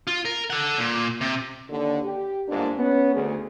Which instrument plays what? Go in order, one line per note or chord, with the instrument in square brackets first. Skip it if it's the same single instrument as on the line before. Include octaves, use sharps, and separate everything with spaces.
[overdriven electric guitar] F4
A#4
A4 F#5
A#2
C3
[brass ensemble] D#2 D3
G4
G1 G#2 A#3 D4
B3 C#4
D2 G#4